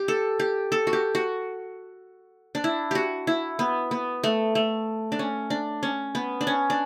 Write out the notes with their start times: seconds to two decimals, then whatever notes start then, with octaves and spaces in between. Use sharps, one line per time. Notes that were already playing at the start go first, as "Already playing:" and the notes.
Already playing: G4
0.08 A4
0.40 G4
0.72 A4
0.87 F#4
0.93 G4
1.15 F#4
2.55 D4
2.64 E4
2.91 F#4 G4
3.27 E4
3.59 B3
3.91 B3
4.24 A3
4.55 A3
5.12 D4
5.19 C#4
5.50 D4
5.83 C#4
6.15 B3
6.41 D4
6.47 C#4
6.70 D4